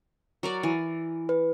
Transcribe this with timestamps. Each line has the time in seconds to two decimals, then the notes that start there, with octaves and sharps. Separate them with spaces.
0.43 F#3 A#4 D5
0.63 E3
1.29 B4